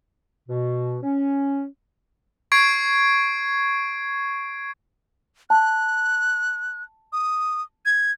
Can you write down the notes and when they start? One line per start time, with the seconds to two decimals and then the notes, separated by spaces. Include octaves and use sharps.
0.49 B2
1.03 C#4
2.52 C#6 G#6 C7 D7
5.50 A5 F#6
7.13 D#6
7.86 G#6